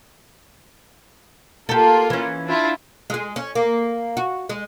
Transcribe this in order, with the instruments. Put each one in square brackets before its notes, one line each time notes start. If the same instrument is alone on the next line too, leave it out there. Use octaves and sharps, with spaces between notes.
[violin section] A#3 F4 [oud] G4 A4
[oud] E3 C#4
[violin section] D4 E4 F4
[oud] G#3 G#4
C#4
A#3
F#4
G#3